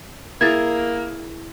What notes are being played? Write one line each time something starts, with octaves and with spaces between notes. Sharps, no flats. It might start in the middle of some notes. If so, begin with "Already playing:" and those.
A#3 E4 G#4 A#4 G#6 A6